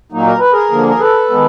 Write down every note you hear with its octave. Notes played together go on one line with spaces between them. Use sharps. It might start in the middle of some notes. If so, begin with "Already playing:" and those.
A#2 F#3 A#3 D#4
A#4
B4
G#4 A#4
D3 F3 A#3
A#4
A4 B4
D#3 G#3 B3